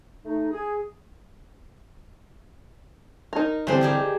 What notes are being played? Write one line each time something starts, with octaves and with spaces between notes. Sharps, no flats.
A3 D#4
G#4
D#4 A#4
D3 E3 G3 C4 C5
D#3 G4 G#4